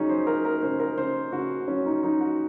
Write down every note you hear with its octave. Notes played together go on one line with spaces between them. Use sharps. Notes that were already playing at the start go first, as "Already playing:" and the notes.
Already playing: C#3 F#3 C#4 D#4 G#4
C5
F#3 A#4
A#4
C#3 C5
A#4
C#3 C5
C#3 F#4
F#3 C#4
D#4
F#3 D#4
F#4